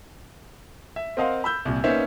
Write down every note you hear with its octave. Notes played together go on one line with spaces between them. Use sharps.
E5
C4 A#4 D#5 F5 F#5 C6
B5 E6 G6
C2 A#2
A#3 B3 C#4 D#4 C5 E5